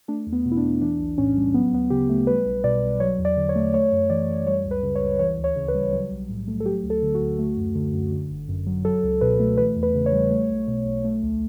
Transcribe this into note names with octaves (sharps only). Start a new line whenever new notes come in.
A3 D4
E2
B3
B2
E4
D4
E2
E3 D4
B1
A2 C#4
G3
F#3 B3
D2 B3
C#3 G4
A3
G3 B4
B1
B2 D5
B1
F#3 C#5
E2
D5
D3
C#5
A3
A3 C#5
F#2
E3 D5
F#2
G3 C#5
C#2
B4
C#3
C#5
C#2
E3 C#5
D2
C#5
C#3
B4
G3
F#3
B1
A2
A3
A4
F#3 G4
D2
A4
D3
F#4
D2
A3
F#2
D3
F#2
D3
G1
F#2
F#3
F#3 A4
C#2
B2 B4
A3
E3 B4
E2
B4
C#3
C#5
G3
A3
B1
B2
B1
A3
D2